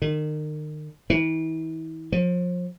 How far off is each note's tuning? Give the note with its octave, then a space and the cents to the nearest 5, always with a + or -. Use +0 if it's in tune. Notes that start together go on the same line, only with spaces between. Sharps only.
D#3 -35
E3 -40
F3 +35